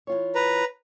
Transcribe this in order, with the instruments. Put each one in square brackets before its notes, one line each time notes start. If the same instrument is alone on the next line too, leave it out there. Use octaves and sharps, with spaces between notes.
[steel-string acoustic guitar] E3 F4 C#5
[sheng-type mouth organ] B4 A#5